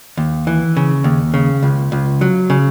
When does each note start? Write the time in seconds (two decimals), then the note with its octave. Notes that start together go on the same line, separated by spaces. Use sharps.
0.17 D#2
0.47 E3
0.77 C#3
1.04 D#2
1.34 C#3
1.63 C#2
1.92 C#2
2.21 F#3
2.50 C#3